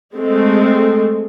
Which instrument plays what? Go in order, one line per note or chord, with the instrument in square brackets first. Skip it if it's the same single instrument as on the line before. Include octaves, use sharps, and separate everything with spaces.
[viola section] G#3 A3 C4